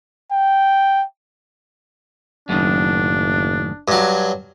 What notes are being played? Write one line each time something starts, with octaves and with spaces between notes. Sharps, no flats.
G5
F#1 F#2 A2 D#3 D4
G2 F#3